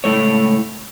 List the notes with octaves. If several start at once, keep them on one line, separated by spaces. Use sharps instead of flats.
C#2 A2 A3 C#5